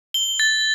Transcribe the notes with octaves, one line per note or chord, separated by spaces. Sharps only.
G7
A6